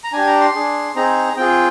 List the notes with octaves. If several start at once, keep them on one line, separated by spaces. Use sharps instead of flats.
A#5
D4 G4 G#5
A#5
C6
D4 G#4
C4 D#4 G#4 A#5
C4 F4 G#4 G5